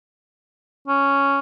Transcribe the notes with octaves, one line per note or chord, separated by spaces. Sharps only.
C#4